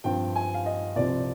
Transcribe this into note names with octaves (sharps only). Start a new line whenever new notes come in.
G2 F3 C4 G5
G#5
F5
D#5
C2 C3 F3 C4 D5